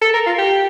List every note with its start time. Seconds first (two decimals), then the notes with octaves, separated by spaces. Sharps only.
0.02 A4
0.14 A#4
0.26 F4
0.38 G4